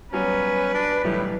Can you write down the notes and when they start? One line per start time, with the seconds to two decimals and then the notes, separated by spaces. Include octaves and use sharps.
0.13 F#3 G3 B3 C#4 B4
0.74 D4
1.04 B1 A2 E3 G3